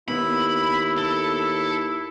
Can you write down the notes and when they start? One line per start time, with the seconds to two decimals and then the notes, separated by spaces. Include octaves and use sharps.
0.08 D#2 B3 E4 B5
0.98 A4